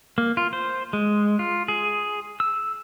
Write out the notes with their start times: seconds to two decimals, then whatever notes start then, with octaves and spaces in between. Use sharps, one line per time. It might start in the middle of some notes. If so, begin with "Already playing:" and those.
0.18 A#3
0.37 F4
0.53 C5
0.93 G#3
1.39 F4
1.68 G#4
2.40 E6